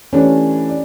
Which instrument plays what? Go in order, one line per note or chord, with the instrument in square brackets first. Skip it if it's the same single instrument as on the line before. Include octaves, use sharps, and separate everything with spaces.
[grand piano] E3 A3 D4 G4 [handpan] C#4
[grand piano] D5